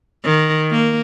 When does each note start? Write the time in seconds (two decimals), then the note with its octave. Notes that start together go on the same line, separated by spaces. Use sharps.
0.24 D#3
0.71 A#3